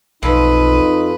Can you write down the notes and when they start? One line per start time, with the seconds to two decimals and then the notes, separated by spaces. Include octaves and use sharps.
0.23 B1 F2 D#4 B4